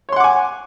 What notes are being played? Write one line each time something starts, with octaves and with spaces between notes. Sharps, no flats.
C#5 F#5 G#5 C6 D6